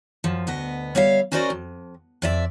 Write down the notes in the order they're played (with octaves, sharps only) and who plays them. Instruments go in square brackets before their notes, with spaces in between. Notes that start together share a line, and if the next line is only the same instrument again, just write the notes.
[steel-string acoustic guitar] F#2 F3
D2 B3 D#5
G3 C#5 E5 F5
C#4 F#4 A#4 C5 D5 D#5
F2
F2 D5 E5